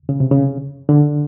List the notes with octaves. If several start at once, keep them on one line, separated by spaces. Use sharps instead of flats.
C#3
C3
C#3
D3